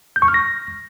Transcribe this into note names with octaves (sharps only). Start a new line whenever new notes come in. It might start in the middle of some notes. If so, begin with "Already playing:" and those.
G6
C#6
F6
A#6